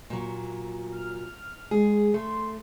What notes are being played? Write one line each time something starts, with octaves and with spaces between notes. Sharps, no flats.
A#2 F#3
F6
G#3 G#4
A3 C6